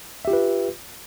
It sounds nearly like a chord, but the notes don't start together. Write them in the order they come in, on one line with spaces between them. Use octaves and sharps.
E5 G4 F4 B4